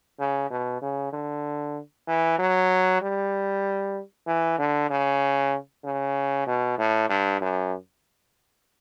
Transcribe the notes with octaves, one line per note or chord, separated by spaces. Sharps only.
C#3
B2
C#3
D3
E3
F#3
G3
E3
D3
C#3
C#3
B2
A2
G2
F#2